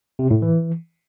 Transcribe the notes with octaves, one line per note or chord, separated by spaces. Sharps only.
C3
A2
E3